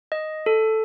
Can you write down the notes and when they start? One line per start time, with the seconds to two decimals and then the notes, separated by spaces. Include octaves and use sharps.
0.12 D#5
0.46 A4